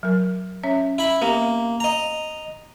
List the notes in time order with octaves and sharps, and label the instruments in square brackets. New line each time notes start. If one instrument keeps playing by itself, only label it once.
[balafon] F#3 A#4
C#4 C#5 E5
[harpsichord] E4 B5
[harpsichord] A#3 [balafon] B3 G4 E5
[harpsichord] D#5 A#5